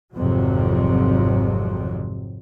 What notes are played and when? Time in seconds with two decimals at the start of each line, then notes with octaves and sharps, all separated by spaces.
0.14 G#1 F2 C3 F#3